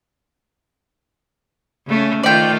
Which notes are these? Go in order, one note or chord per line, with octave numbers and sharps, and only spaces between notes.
C#3 A3 C#4
D#3 A3 F4 D5 G5